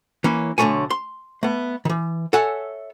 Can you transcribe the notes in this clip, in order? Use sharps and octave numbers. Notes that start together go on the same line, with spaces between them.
E3 A#3 C#4
B1 D3 F#3 A3 C#5 G#5
C6
A3 B3
D#3 E3
A4 C#5 E5 F#5 G#5